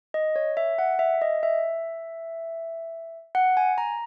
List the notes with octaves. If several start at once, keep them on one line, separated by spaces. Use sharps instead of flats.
D#5
C#5
E5
F#5
E5
D#5
E5
F#5
G#5
A#5